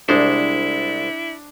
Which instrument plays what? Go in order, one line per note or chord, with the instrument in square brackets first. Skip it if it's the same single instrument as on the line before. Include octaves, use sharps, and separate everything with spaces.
[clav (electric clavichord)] C2 G#3 C5 [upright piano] D4 [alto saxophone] E4